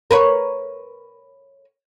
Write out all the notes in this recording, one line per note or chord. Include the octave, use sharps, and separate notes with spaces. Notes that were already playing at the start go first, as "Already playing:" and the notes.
A#4 B4 C#5